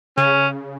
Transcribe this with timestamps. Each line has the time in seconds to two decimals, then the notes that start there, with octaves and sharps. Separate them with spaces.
0.17 C#3 C#4